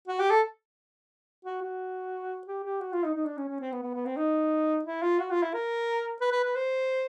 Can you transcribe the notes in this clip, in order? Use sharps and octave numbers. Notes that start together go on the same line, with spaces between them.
F#4
G4
A4
F#4
F#4
G4
G4
F#4
F4
D#4
D#4
D4
C#4
C#4
C4
B3
B3
B3
C4
D#4
E4
F4
F#4
F4
E4
A#4
B4
B4
B4
C5